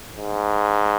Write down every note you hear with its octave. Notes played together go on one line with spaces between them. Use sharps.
G#2